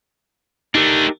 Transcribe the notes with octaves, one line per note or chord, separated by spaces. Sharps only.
A3 D4 D#4 G4 A#4